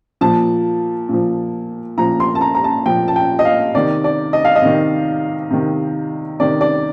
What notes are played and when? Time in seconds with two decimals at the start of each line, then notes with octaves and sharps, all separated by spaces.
0.21 A#2 F3 A5
1.09 A#2 F3
1.98 A#2 F3 A#5
2.20 C6
2.35 A5
2.41 A#5
2.55 A#5
2.64 A5
2.86 A#2 F3 G5
3.08 A5
3.16 G5
3.39 D#5
3.45 F5
3.74 C3 D#3 D5
4.04 D5
4.33 D#5
4.45 F5
4.56 D#5
4.62 C3 D#3
5.50 C3 D#3
6.40 C3 D#3 D5
6.61 D5